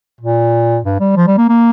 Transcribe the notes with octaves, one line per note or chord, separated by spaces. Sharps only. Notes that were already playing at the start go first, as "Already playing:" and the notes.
A#2
G2
G3
F3
G3
A#3
A#3